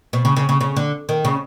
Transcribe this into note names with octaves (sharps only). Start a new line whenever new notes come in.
B2
C#3
C#3
C#3
C#3
D3
D#3
C#3